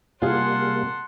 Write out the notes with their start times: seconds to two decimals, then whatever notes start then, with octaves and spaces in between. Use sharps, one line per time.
0.22 C3 G3 A#3 F4 G#4 F#5 A5 C6